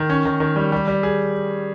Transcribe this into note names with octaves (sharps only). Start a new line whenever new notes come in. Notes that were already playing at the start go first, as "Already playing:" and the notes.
Already playing: D#3
C#4
D#3
D#3
G3
G3
G3
G#4